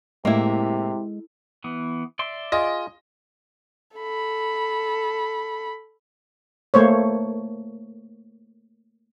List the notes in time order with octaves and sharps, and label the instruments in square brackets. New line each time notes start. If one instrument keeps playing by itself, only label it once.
[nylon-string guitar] A2 [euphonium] C3 [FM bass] G#3 [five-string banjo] A#3 E4
[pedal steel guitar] E3 B3
D5 E5 C6
[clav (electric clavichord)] F4 G#4 [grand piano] D#5
[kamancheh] A4 B5
[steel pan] A3 A#3 C5 C#5